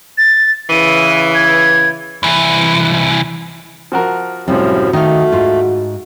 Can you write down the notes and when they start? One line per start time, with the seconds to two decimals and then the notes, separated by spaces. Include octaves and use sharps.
0.18 A6
0.70 C#3 E3 D#7
1.35 G#6
2.23 C2 E3
3.92 F3 F#4 A#4
4.48 F#2 A2 C3 F3 G3 F#4
4.93 D#3 A3 D#4 F5
5.32 G#2 F4